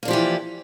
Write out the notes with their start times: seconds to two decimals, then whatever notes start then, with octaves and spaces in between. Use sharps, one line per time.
0.03 A#3
0.05 D4
0.08 F3
0.11 G4
0.13 E3